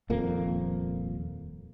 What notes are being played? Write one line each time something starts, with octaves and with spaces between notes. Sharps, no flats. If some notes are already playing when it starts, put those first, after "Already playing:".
D#1 F2 A#3